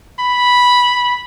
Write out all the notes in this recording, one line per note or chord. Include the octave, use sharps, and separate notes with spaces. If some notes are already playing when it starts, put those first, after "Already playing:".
B5